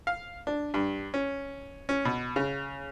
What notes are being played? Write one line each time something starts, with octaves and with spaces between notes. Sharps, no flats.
F5
D4
G2
C#4
C#4
B2
C#3